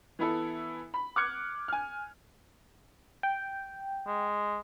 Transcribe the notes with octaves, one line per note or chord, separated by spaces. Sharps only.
E3 B3 E4 A4
B5
D6 F6 F#6 G#6 C#7
G#5 F6
G5
G#3